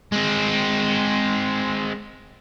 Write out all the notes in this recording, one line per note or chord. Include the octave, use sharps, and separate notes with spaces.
G#3 C4